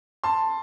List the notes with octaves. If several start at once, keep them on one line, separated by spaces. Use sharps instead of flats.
A5 C6